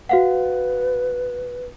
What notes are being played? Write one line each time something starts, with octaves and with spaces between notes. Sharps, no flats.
F#4 B4 F5 F#5